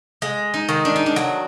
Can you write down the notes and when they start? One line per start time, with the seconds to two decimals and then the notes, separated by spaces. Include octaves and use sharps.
0.22 G#3
0.54 D#4
0.69 D#3
0.85 D4
0.96 D#4
1.06 D4
1.16 F#3